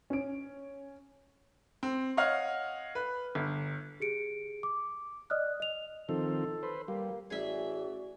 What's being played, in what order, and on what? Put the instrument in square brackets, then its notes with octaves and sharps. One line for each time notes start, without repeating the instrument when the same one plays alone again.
[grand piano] C#4 D7
[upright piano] C4
C#5 D#5 F5 F#5 F6
B4
G1
[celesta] G4 G#4 C#7 D7
D6
D5 D#5 D#6 F6 F#6
D#5 F7
[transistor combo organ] D#3 F3 C4 [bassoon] A4
[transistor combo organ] B4 C5
[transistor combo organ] G3 [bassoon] A#3
[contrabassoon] A1 [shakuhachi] F#4 [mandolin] G#4 E5 [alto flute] D5